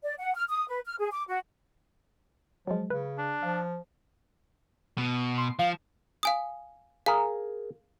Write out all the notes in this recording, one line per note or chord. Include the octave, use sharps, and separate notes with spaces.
D5
F#5
F6
D#6
B4
F6
G#4
D6
F#4
F3 F#3 G#3
C#3 B4
D4
F3 F5
B2
C6
F3 F5
F5 G#5 D#6
G#4 A#4 F5